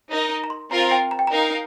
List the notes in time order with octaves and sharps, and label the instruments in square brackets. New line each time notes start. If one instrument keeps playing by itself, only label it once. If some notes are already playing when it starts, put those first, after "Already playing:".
[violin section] D#4 A#4 D#5
[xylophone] A#5
C6
[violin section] C4 F4 A#4 F5 [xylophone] A#5
[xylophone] G5
A#5
G5
[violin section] D#4 A#4 F5 [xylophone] A#5